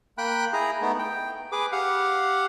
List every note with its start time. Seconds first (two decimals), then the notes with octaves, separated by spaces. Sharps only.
0.18 A#3 G5 B5 F#6
0.53 E4 G#4 A#5
0.81 A3 B3 D#4
0.99 G5
1.52 G#4 B4 D6
1.72 G4 F5 F#5